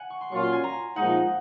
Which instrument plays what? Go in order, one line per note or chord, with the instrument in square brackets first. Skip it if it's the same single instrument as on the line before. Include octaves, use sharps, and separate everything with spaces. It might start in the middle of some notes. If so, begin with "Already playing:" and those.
Already playing: [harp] F#5 G#5
C#6
C6
[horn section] A#2 F#3 C#4 F4 [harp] C#6
[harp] C6
G#5
A#5
[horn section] A#2 F3 G#3 D#4 [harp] F#5